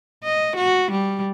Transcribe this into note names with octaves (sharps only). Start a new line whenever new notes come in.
D#5
F#4
G3